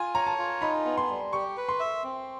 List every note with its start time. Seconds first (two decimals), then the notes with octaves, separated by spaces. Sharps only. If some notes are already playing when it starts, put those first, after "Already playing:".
Already playing: F4 G#5
0.15 C#5 A#5
0.27 A5
0.38 F4
0.62 D#4 B5
0.85 B3
0.97 C6
1.10 G3
1.33 G4 C#6
1.57 B4
1.69 C6
1.80 E5
2.04 C4